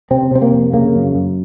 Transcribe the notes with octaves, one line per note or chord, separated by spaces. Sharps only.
C3 C4
C3 C4
A#3
F2
C#3 A#3
F#2
F#2